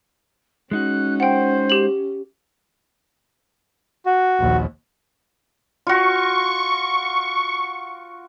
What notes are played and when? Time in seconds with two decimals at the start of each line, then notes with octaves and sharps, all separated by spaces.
0.71 G#3 C#4 D#4 F#4 F#6
1.20 C5 F#5 G5
1.70 G4 F#7
4.06 F#4
4.38 A#1 D#2
5.87 F4 F#4 C#6